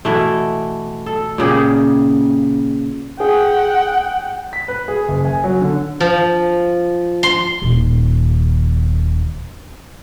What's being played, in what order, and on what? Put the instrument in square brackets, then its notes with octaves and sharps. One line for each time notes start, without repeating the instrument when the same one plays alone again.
[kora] B2 E3 A3
A4
A#2 C#3 G4 G#4
[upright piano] G#4 [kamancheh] F#5 G5
[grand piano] B6
B4
G#4
F#1
G#5
F#3
D3
[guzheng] F3
C6
[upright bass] D#1 D#3